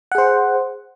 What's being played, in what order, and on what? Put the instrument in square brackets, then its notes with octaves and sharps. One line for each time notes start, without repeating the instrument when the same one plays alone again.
[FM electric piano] F#5
G#4
C5